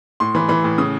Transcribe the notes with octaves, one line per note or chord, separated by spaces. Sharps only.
A2 C6
E3 B5
E3 B5
A2
C#3 D#6